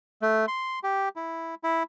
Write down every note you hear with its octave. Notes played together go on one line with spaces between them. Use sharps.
A3
C6
G4
E4
E4